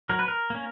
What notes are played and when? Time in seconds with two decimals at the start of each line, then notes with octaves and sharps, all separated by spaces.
0.09 F#3 A#4
0.19 B4
0.28 A#4
0.50 A#3 C#4